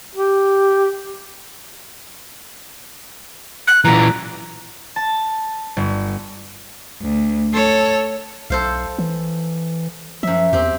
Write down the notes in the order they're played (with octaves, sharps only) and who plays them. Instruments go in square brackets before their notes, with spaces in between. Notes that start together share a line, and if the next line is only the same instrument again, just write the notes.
[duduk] G4
[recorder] F#6
[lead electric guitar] A#2 E3 [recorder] A#5
[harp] A5
G1
[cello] D2
A4 C#5
[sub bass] B1 [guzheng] A4 C5 F5
[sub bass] E3
[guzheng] F#2 E5 [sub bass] F3
[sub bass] E2 [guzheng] C4 G4